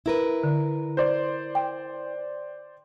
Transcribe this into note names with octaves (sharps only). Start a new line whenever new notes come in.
E4 A#4 B4
D3
C5 D5
G5